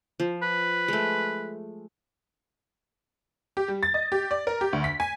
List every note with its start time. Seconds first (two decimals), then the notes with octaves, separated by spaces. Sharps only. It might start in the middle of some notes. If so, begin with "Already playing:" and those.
0.20 F3
0.42 B4
0.88 G#3 A3
3.57 G4
3.68 G3
3.83 A6
3.94 D#5
4.12 G4
4.31 D5
4.47 A#4
4.61 G4
4.73 D2
4.84 B6
5.00 G#5